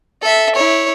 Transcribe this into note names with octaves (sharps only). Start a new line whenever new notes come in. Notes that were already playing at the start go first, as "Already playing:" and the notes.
A4 E5
E4 C#5